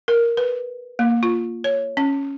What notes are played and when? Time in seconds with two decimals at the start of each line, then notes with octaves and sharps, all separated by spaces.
0.08 A#4
0.37 B4
0.99 A#3
1.23 F4
1.64 C#5
1.97 C#4